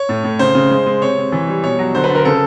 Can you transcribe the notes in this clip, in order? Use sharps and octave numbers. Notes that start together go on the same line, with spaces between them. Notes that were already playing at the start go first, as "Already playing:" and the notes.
Already playing: C#5
A2
A2
C#3 C5
C#3
G#3
G#3
C3 C#5
C3
E3
G3
B2 C#5
F#3
D3 C5
B4
D3
A#4
C#3 A4